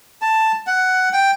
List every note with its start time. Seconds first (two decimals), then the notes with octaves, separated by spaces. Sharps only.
0.22 A5
0.67 F#5
1.13 G5